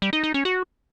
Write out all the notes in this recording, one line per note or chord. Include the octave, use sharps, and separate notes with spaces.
G3
D#4
D#4
C#4
F#4